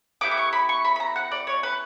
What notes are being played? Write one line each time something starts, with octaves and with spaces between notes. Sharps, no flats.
B3 E4 G4 D6
D6
C#6
B5
C#6
B5
B5
A#5
F#5
D5
C#5
B4